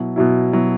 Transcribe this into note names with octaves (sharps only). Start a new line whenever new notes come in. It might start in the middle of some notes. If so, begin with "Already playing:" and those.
Already playing: B2 F#3 E4
B2 F#3 E4
B2 F#3 E4